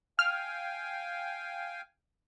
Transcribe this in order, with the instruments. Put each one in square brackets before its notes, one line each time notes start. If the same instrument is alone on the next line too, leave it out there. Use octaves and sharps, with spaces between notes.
[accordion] F5 G5 G#5 [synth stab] F6